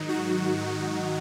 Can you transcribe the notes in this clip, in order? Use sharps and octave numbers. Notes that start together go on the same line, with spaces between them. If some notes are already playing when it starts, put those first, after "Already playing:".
Already playing: G#2 D#3 F#3 D#4
F#4